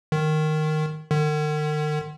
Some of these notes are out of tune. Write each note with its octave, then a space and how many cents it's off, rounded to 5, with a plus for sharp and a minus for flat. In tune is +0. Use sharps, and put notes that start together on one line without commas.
D#3 -10
D#3 -45